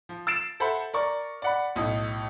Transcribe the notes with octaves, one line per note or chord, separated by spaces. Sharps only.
F3
E6 A6 C7 D7 E7
A4 C5 E5 F#5 B5
A#4 D5 C#6
D5 F#5 B5
B1 A2 D#6